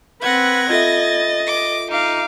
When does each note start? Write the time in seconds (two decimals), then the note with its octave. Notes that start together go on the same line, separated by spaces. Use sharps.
0.22 C4 B4 F#5 G#6 A#6
0.70 F4 A4 D#5 E5 A6
1.47 D6
1.91 D#4 F5 D6